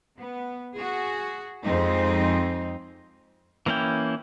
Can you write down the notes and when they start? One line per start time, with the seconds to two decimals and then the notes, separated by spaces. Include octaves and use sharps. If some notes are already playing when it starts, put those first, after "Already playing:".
0.19 B3
0.76 F#4 G#4
1.63 F2 G#3 C4 D#4
3.66 E3 A#3 C#4 E4 G5